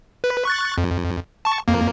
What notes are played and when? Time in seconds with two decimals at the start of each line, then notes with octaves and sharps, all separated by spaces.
0.24 B4
0.45 C#6 F#6 A6
0.78 F2
1.45 A5 C#6
1.68 F2 A#3